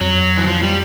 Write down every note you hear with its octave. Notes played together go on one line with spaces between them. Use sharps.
F2 F#3
E3
F3
G3